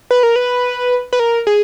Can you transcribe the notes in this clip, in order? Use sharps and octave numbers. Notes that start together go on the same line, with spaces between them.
B4
A#4
B4
B4
A#4
G#4